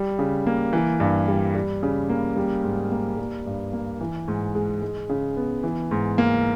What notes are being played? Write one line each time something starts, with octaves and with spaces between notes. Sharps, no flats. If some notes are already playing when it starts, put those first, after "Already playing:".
Already playing: G3
C#3
A#3
E3
G2
G3
G3
C#3
A#3
G3
G#2
A#3
G3
G2
A#3
E3
G#2
G#3
G#3
C#3
B3
E3
G#2
A#3